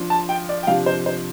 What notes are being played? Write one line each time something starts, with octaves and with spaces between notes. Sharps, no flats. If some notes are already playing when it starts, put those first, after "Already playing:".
Already playing: F3 D4
A5
G5
D5
G5
C3 F3 D4 F5
C5
C5